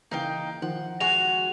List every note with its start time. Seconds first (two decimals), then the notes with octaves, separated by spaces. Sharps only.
0.11 C#3 E3 A#3 D#4 F5 G5
0.62 D#3 F3 F#5
1.00 G#3 F#4 G#5 F7